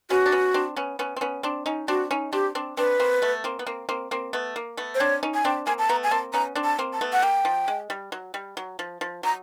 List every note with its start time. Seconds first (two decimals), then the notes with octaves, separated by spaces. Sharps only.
0.10 B3 C#4 F#4
0.26 D4
0.32 B3 C#4
0.54 C4 D4
0.76 B3 C#4
0.99 B3 C#4
1.16 C4
1.21 B3 C#4
1.43 C4 D4
1.66 C#4 D#4
1.88 C4 D4 F#4
2.11 C#4 D#4
2.33 C4 D4 G4
2.55 C4 D4
2.77 C4 D4 B4
3.00 A#3 C4
3.22 A3 B3
3.44 A#3 C4
3.59 B3
3.67 A#3 C4
3.89 A#3 C4
4.11 A#3 C4
4.33 A3 B3
4.56 A#3
4.77 A3 B3
4.95 C5
5.00 C4 D4 C#5
5.23 C#4 D#4
5.34 G#5
5.45 C4 D4 G5
5.66 A#3 C4 G#5
5.79 A5
5.89 A3 B3 A#5
6.04 G#5
6.11 A#3 C4 A5
6.33 B3 C#4 A#5
6.55 C4 D4
6.64 A5
6.79 A#3 C4
6.93 A5
7.01 A3 B3
7.13 F#5
7.22 A#3 G5
7.45 F3
7.68 G#3
7.90 G3
8.12 F#3
8.34 G3
8.57 F#3
8.79 F3
9.01 F3
9.23 F#3 A#5